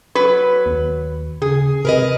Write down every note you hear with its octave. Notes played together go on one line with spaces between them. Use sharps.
F#3 B4
D#2
C#3 G#4
C3 A#4 B4 D#5